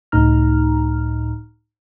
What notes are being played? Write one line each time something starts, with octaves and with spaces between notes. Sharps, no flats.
C#2 A2 D#4 A#5 F6